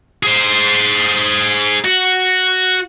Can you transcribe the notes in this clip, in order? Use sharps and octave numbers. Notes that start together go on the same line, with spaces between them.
G#4 C5
F#4